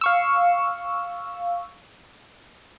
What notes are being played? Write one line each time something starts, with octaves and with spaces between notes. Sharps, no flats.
F5 C#6 E6